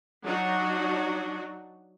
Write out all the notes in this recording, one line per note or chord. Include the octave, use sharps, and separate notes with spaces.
F#3 D4 D#4 F#4